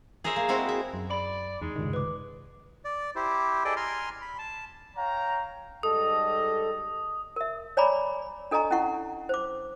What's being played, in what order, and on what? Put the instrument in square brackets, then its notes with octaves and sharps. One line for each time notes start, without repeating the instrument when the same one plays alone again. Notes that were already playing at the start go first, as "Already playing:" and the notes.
[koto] G#4 A#4 C5 C#5 E5
A#3
G#3 C4 E4 F#4
E5
[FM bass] F#2
[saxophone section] D5 [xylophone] B5
[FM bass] E2 [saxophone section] G#3 [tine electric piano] D#4
[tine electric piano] C#2 G2 C3 [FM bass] D#3
[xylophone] B4 D6
[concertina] D5
E4 G4 C5
G#4 A4 D5 D#5 G5
G#5 A#5 C6 F6
B5
A5
[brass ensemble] C#5 F5 G5 A#5
[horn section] G#2 G3 D#5 [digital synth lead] A4 [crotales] D#6
[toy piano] A#4 E5
C#5 D5 G#5 A#5 B5 D6
D4 A4 D#5 G#5 A#5 C#6
C#4 E4 F#5 C#6
C5 D6